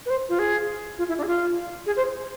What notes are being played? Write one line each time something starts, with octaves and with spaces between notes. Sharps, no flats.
B4
C5
F4
G#4
F4
E4
D4
G#4
F4
G#4
C5